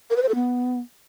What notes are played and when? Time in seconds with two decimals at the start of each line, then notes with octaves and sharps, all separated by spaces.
0.10 A#4
0.16 B4
0.23 C5
0.29 A4
0.35 B3